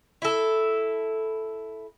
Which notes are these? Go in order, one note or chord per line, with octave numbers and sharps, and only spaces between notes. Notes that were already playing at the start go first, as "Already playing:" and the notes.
E4 A4